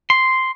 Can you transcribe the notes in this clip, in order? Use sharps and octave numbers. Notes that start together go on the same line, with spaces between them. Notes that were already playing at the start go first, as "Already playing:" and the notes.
C6